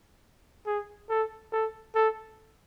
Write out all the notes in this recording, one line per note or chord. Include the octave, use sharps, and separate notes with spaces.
G#4
A4
A4
A4